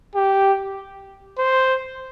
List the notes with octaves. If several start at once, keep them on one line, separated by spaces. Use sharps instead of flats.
G4
C5